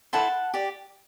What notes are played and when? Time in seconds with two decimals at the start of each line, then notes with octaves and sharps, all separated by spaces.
0.13 E4 A4 C5 F#5 A5
0.54 G4 D5